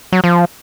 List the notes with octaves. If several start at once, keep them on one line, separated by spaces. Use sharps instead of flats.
F#3
F3